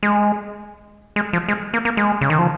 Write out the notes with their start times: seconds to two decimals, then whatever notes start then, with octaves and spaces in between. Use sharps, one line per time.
0.03 G#3
1.16 G#3
1.33 F3
1.48 G#3
1.74 A#3
1.85 A#3
1.97 G#3
2.21 C#3
2.30 D#3
2.39 F3